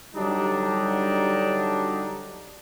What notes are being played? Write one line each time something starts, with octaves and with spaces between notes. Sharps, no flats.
D3 F#3 G3 D4 D#4